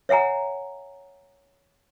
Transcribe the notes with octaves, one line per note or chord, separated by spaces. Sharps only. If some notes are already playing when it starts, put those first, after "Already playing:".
C#5 E5 F#5 G#5 A#5